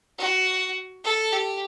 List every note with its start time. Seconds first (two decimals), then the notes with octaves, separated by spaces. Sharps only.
0.19 F#4
1.04 A4
1.33 G4